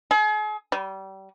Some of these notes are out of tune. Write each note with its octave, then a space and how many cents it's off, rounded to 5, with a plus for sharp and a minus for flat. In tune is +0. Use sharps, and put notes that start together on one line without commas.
G#4 +40
G3 -30